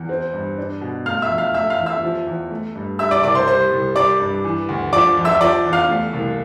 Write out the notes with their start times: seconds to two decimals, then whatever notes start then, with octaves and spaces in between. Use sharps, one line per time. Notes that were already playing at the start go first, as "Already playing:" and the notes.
Already playing: E2
0.09 C4
0.33 G2
0.58 D4
0.81 B2
1.06 A3 F5 F6
1.22 E5 E6
1.30 F2
1.38 F5 F6
1.54 A3 E5 E6
1.70 F5 F6
1.78 E2
1.86 E5 E6
2.02 F3
2.27 E2
2.51 A3
2.75 G2
2.99 G3 E5 E6
3.11 D5 D6
3.24 C2 D5 D6
3.35 C5 C6
3.47 G3 C5 C6
3.72 C2
3.96 G3 D5 D6
4.20 G2
4.44 E3
4.69 D2
4.93 F3 D5 D6
5.17 F2
5.25 E5 E6
5.41 F3 D5 D6
5.66 E2
5.73 F5 F6
5.89 A3
6.13 C2